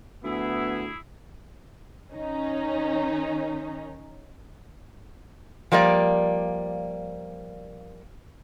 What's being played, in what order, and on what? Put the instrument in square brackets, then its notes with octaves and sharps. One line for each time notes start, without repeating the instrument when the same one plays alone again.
[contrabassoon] D2 [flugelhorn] B3 [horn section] E4 G#4
[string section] D#3 C#4 D#4
[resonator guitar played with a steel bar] F3 G3 A#3 D5